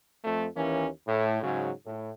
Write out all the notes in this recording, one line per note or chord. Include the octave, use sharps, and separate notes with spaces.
F2 A3
D#2 E3 A#3 C#4
A2
G#2 C#3 F#3
A2